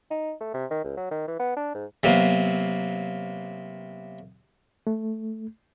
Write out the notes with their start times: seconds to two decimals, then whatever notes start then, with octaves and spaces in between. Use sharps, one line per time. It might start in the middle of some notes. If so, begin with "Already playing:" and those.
0.11 D#4
0.41 A3
0.54 C3
0.71 D#3
0.84 C#2
0.97 F#3
1.11 D#3
1.28 E3
1.39 B3
1.57 D4
1.75 G#2
2.03 C3 F#3 A#3 B3
4.87 A3